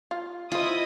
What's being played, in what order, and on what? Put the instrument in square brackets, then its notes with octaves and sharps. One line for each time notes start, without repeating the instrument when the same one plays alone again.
[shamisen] F4
[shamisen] C#4 C5 [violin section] E4 D#5 D#6 [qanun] F4